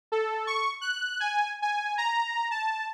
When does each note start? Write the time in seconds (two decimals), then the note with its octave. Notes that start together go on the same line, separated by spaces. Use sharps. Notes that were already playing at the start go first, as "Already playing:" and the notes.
0.12 A4
0.47 C#6
0.81 F#6
1.20 G#5
1.62 G#5
1.98 A#5
2.51 A5